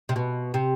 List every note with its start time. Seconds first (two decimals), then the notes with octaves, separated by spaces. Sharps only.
0.09 C3
0.16 B2
0.54 C3